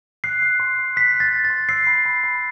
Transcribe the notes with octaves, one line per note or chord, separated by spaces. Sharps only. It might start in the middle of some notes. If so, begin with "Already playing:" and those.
F#6 C7
F#6
C6
C6
F#6 B6
F#6
A6
C6
A6
C6
E6 C7
B5
B5
B5